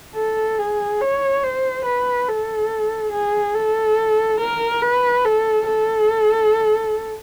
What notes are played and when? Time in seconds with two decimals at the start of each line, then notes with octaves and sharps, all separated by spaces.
0.16 A4
0.59 G#4
1.01 C#5
1.43 C5
1.85 B4
2.28 A4
3.12 G#4
3.55 A4
4.41 A#4
4.82 B4
5.25 A4
5.67 A4